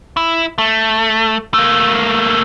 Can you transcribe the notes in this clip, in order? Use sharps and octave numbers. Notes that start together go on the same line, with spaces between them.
E4
A3
A3 A#3